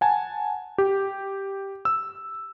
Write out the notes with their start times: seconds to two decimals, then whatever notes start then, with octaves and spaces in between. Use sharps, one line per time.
0.01 F#5 G#5 A5
0.78 G4
1.85 E6